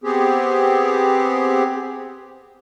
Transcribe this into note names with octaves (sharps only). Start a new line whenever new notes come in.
B3 C4 G4 G#4